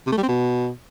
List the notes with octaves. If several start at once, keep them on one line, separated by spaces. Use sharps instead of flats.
C3
A3
G3
C4
B2